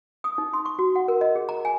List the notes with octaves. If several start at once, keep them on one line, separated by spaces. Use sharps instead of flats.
D#6
D#4
C6
C#6
F#4
F#5
A#4
D#5
G#4
A#5
G#5